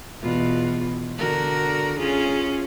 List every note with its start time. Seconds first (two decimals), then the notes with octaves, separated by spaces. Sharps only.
0.22 E2 B2 F4
1.18 D3 F#4 A#4
1.99 C#4 F4 G#4